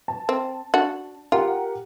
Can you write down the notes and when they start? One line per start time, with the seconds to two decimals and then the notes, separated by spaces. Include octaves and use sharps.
0.08 A5
0.29 C4
0.74 D4 F#4
1.32 F4 G4 A#4 F#5